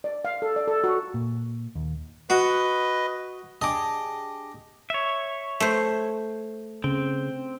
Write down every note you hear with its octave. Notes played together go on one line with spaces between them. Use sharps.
D5
F5
A4
D5
A4
F#4
A#2
D#2
F#4 B4 D#5
D4 G4 G#4 D#5 D6
C#5 E5
A3 C5
C#3 C4